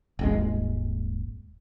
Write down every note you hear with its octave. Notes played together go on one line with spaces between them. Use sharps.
D#1 G#1 G#3